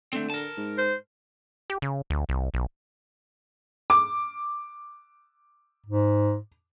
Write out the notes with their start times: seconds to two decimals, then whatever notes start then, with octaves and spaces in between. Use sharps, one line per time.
0.13 D3 A3 C4
0.30 A#4 A5
0.57 G#2
0.78 C5
1.70 G4
1.82 C#3
2.10 D2
2.29 C2
2.54 B1
3.90 D6
5.86 G#2